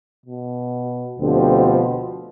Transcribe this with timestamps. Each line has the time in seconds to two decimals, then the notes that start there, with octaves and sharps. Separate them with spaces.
0.26 B2
1.19 D2 B2 D3 F3 C4 G4